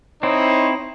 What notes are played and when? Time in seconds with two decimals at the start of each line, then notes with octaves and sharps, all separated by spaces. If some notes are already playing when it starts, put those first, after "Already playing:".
0.23 C4 D#4 E4 C5 C#5